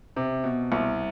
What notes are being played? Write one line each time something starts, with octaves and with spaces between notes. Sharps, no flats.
C3
B2
C2